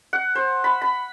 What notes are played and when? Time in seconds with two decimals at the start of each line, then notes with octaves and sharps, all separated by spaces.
0.13 F#5
0.35 C5
0.64 B5
0.82 B5